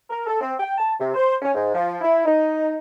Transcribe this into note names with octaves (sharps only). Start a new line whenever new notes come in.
A#4
A4
C4
G5
A5
C3
C5
C#4
G#2
F3
E4
D#4